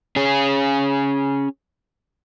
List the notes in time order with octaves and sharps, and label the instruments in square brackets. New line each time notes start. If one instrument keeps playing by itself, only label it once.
[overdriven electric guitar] C#4 G#4